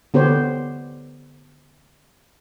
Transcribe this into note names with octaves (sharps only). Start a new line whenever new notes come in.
D3 B3 G4 C5 C#5